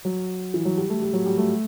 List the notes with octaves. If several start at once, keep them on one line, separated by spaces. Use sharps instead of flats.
F#3
E3
F#3
G3
A3
G3
F#3
G3
A3